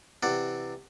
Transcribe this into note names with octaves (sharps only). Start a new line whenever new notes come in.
C3 E3 D5 F#5